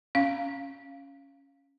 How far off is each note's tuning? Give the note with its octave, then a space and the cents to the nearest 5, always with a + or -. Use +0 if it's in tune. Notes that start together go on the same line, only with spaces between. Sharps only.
C#4 +0 F5 +0